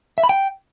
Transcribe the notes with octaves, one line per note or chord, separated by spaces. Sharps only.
E5
B5
G5